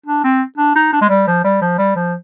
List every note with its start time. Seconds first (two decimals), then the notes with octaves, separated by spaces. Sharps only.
0.06 D4
0.24 C4
0.58 D4
0.76 D#4
0.93 D4
1.01 G#3
1.09 G3
1.27 F3
1.44 G3
1.61 F3
1.78 G3
1.96 F3